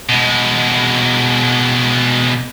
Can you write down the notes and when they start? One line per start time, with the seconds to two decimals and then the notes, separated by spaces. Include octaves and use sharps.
0.09 B2 G#3